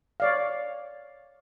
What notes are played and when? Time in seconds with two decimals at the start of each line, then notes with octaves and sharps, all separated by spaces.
0.20 C#5 D5 F5